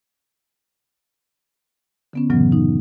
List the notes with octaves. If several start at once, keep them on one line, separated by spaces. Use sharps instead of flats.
D3 B3 C#4
F#2 A2 C#3 E3 F#3 B3
D#4